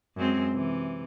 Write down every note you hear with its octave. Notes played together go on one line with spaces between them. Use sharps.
F#2 G#3 C4
C3 E3